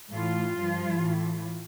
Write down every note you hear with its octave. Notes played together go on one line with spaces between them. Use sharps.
A2 E3 F4
G2 F3
A2 E3